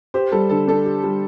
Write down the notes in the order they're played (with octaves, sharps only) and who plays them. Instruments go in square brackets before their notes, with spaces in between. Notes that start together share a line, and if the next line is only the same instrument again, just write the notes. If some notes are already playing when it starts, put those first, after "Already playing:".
[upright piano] G4 [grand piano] C5
[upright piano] G3 [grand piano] A4
[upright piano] D3 [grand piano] A4
[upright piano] D4 [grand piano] A4
[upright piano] G4
G3